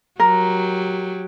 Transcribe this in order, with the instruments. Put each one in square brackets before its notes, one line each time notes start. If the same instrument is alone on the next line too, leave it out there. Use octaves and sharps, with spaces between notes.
[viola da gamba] F#3 G4 [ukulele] A#4